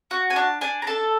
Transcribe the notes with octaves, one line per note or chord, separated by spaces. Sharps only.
F#4
G#5
D4 A5
D4 G#5
A#5
A4 A5